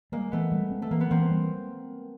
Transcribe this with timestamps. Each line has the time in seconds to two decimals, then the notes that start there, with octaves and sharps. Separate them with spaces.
0.12 G3 G#3 A#3
0.32 E3 A3 B3
0.52 G3
0.72 C4
0.82 A3
0.91 E3 A#3
1.01 B3
1.11 E3 A#3 C4
1.30 G3